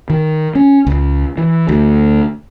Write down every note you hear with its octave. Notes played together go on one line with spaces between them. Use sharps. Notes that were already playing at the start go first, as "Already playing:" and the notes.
D#3
C#4
C#2
E3
D2